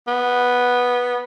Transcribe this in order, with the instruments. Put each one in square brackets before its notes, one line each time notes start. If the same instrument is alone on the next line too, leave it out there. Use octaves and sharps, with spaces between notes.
[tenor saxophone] B3